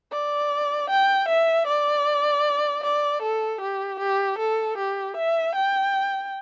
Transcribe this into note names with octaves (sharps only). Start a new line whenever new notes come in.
D5
G5
E5
D5
D5
A4
G4
G4
A4
G4
E5
G5